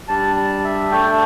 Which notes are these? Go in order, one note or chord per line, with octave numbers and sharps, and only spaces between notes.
G3 D4 A5
A5
E5
A3 D4 G5